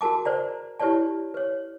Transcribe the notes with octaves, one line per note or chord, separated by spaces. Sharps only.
F#4 G#4 A#4 A5 D6
B4 C5 D5 A#5
E4 G4 B4 C#5 D5 A5
B4 C#5